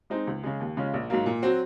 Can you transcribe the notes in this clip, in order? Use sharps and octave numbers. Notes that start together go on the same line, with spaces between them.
G#3 C4 D#4
C#2
C#3 G#3
D#2
C#3 G#3 C#4 F4
A#1
G#2 F#3 A#3
A#2
F#3 C4 F#4